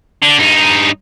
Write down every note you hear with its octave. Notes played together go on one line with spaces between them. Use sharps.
D3
G2 D#4